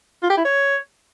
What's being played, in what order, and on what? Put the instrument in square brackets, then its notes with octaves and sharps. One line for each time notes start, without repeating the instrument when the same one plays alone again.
[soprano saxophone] F4
G4
E4
C#5